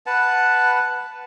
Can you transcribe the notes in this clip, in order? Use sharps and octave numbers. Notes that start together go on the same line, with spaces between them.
B4 F#5 A5